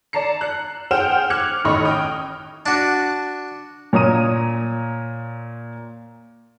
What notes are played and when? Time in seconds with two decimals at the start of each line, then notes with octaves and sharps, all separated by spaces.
0.13 D5 A5 A#5 C7 C#7
0.41 F#6
0.91 G#4 C5 F#5 G5 F6 E7
1.30 D6 F6 F#6 G#6 C#7
1.65 A1 D#3 D#5 B5 C#6 F6
1.85 G5 D#6 F6
2.66 D4 F#4
3.93 A#2 C#5 A#5 D#6 D#7